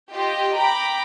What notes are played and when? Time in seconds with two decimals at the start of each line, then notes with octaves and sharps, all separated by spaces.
0.13 F4 G4 D#5 G5
0.55 G5 A#5 B5 D6